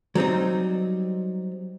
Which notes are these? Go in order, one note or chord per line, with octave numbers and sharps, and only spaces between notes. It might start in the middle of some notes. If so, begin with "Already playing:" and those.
F#3 G3 C4 D#4